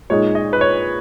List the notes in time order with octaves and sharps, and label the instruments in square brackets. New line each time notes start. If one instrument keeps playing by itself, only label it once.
[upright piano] A#2 G#3 D#4 [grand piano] C#5
[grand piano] D#5
B4
C#5